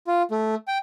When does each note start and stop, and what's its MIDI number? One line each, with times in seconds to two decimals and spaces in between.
0.07 0.23 65
0.31 0.55 57
0.68 0.78 79